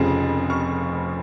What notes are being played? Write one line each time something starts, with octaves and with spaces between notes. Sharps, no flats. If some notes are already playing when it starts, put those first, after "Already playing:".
Already playing: F1 F2 C#3 F3
C#6 F6